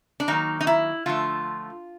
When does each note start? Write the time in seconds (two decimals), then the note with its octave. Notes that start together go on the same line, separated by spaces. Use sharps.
0.20 D4
0.28 D#3 F#3 A#3 D#4
0.61 D#4
0.67 E4
1.06 D3 F3 A3 F4